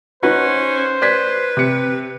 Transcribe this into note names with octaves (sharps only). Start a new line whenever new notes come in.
C#4 D#4 F#4 B4 C5
B4 D5 G#6 B6
C3 C#7